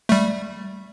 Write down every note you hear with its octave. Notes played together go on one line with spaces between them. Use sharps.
G3 A3